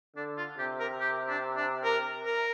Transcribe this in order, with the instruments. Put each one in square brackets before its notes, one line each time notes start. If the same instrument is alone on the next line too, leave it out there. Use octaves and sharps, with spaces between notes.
[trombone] D3 [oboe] D4
[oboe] F4
[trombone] C3 [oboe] G4
[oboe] A#4
G4
D4
D4
A#4
A#4